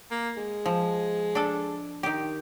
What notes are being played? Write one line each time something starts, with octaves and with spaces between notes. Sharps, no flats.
A#3
G#3
F3
D4 A4
D#3 G4